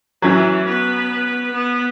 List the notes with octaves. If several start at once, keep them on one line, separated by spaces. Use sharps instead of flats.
E3 F#3 C#4 E4
B3 B4
B3